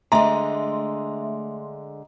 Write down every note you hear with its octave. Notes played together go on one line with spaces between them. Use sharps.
D3 G#3 A3 E5 A#5 C6